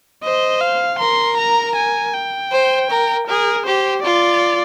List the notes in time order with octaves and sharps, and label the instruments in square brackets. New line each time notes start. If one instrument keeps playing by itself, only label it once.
[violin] C5 [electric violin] D#5
[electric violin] F5
[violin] A#4 [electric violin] C6
[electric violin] A#5
G#5
G5
[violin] C5
A#4
[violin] G#4 [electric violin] A#4
[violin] G4 [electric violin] C5
[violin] F4 [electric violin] D5